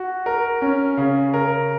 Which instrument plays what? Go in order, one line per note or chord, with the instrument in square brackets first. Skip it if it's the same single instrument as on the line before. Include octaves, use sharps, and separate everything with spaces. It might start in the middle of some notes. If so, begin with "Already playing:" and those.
Already playing: [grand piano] F#4
A#4
C#4
C#3
A#4